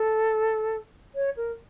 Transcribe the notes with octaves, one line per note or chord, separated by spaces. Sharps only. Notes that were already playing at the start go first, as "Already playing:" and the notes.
Already playing: A4
C#5
A#4